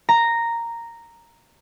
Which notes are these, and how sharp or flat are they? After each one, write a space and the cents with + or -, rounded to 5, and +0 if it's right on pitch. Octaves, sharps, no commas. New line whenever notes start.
A#5 -5